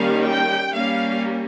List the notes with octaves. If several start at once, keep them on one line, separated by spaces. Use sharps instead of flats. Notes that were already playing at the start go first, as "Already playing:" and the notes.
Already playing: D#3 G3 A#3 C#4 F5
G5
G3 A#3 C#4 F5